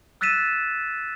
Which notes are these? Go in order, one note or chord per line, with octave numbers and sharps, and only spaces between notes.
E6 F#6 A6 B6 D#7 E7